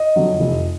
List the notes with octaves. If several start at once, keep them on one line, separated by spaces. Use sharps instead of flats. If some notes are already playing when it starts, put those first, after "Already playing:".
Already playing: D#5
F2 D3 F#3
F1